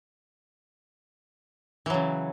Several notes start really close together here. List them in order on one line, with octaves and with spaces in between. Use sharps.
E3 F#3 C#3